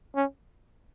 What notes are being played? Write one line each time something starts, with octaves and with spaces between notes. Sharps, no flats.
C#4